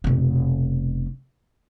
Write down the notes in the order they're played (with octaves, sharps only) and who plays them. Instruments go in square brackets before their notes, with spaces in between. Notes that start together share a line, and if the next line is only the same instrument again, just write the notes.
[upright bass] F1 B2